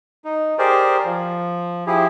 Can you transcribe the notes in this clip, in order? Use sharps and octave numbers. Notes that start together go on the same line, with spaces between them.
D#4
G4 G#4 A#4 C5 D5
F3
F3 E4 G4 G#4